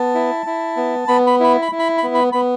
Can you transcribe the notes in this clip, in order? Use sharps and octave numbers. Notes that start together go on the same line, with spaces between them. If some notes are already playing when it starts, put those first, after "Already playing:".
Already playing: B3 A5
E4
E4
B3
B3 B5
B5
E4 B5
B5
E4
B5
B5
B3
B5
B3 B5